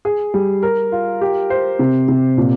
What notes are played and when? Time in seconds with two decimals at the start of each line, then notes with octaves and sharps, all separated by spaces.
0.05 G#4
0.34 G3
0.63 A#4
0.92 F4
1.21 G4
1.50 C5
1.79 C3
2.08 C3
2.37 A#2